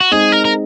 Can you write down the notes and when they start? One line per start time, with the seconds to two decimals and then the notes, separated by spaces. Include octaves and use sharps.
0.01 F#4
0.11 G#3 C4 D#4 G#4
0.32 A#4
0.45 A#4